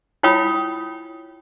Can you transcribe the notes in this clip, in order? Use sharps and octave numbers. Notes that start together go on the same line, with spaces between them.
E4 F4 C#5 G5 B5 D#6